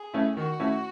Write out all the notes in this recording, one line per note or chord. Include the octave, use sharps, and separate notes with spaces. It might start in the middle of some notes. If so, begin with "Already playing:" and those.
Already playing: G#4
A3 C#4 E4
D#3 F#4
A3 C#4 E4